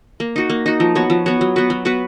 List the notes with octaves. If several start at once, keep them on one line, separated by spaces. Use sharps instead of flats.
A#3
D#4 F#4
A#3
D#4 F#4
F3
B3 F#4 C#5
F3
B3 F#4 C#5
F#3
B3 F#4 B4
F#3
B3 F#4 B4